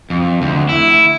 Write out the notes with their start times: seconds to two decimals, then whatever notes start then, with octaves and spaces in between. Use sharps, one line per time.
0.10 F2
0.42 D2
0.69 E4